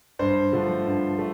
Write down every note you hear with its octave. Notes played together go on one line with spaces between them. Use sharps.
G2 C5
D3 F3 A3
G2
A3